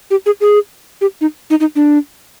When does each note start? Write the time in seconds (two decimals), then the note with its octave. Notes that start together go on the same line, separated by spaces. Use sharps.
0.11 G4
0.26 G#4
0.41 G#4
1.01 G4
1.21 D#4
1.50 D#4
1.60 D#4
1.76 D4